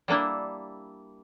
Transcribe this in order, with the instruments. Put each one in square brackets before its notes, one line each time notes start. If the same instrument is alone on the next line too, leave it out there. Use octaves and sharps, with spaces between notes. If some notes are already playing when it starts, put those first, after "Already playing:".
[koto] G3 A#3 D4 E4